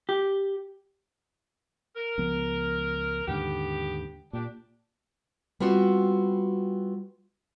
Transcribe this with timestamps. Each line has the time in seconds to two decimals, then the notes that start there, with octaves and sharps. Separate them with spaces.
0.09 G4
1.96 A#4
2.18 C#2 F3 B3
3.28 D#2 G#2 D3 B3 G4
4.33 A#2 D4 G4
5.60 G3 B3 C4 F4 F#4